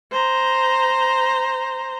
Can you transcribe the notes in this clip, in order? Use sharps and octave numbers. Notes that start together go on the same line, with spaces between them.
C5 A#5